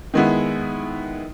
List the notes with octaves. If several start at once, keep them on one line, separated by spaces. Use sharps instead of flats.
D#3 G#3 B3 E4